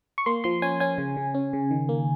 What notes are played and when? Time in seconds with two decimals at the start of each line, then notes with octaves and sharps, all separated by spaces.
0.18 C#6
0.26 A#3 C6
0.44 F3 C6
0.62 C#4 G#5
0.80 C#4 G#5
0.98 C#3
1.17 C#3
1.34 C#4
1.53 C#3
1.71 D#3
1.89 A#3